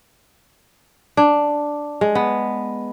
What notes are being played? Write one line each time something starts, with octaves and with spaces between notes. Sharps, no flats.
D4
G#3
B3